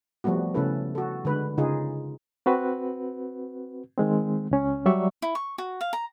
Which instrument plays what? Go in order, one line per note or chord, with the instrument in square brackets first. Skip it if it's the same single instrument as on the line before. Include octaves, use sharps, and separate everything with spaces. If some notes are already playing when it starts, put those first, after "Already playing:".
[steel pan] F3 G3 A3 B3 F#4
C#3 A3 C#4 E4 A4 B4
F#4 A4
D3 G#3 B4
C#3 D#4 F4 G#4
[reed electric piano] C4 F#4 B4
D#3 G#3 C4
C#2 C#4
F#3 G3 D5 E5 C#6
[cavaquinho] E4
C#6
F#4
F5
A#5